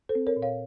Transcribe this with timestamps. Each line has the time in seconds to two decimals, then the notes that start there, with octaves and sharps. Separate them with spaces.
0.09 A4 C5
0.15 C4
0.27 A#4 C#5
0.37 A#2
0.42 C#5 F5